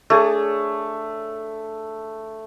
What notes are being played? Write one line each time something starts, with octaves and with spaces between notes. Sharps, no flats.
A3 D4 G#4 C#5